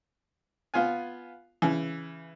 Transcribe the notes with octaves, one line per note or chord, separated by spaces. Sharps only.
B3 F4 F5 G#5
C#3 E3